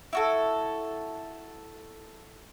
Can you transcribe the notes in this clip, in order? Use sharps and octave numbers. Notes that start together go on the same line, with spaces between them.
E4 F#4 A4